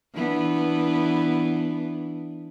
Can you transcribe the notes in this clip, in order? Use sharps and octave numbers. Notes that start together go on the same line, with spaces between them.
E3 B3 D4